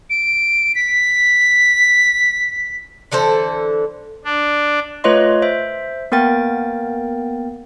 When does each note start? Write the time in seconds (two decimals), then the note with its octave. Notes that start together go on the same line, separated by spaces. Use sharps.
0.10 D7
0.75 B6
3.12 D3 E3 A4 C5
4.25 D4
5.04 A3 F4 B4 C#5 D#5 C6
5.42 C5 E5
6.12 A#3 B3 A#4 G5 A6